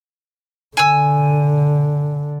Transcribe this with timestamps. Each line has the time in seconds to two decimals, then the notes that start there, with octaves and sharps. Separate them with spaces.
0.77 D3 G#5 E6